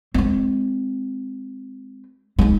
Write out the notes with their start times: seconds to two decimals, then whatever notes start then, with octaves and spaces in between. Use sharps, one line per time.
0.14 G#3 C4
2.39 G#3 D#4